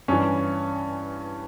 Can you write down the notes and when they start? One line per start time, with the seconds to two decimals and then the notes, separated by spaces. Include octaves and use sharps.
0.08 G2 E3 C#4